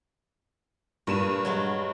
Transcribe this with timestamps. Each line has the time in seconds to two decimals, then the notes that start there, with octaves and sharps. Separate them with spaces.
1.07 G2 A#2 D#7 E7
1.45 F#3 G#3 F#4